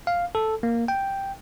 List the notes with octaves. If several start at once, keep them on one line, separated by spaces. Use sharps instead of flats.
F5
A4
A#3
G5